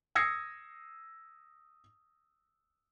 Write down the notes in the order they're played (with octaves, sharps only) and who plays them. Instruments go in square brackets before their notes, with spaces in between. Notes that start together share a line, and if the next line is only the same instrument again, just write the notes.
[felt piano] D#6 E6 G#6 A#6 C7 C#7